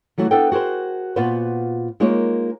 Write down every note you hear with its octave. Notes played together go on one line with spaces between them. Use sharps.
E3 F#3 A3 F#4
B3 D4 A4 B4 F#5 G5
F#4 G#4 A#4 C5
A#2 B3 F4 F#4 B4 C5
G#3 A#3 D#4 F4 A#4 C#5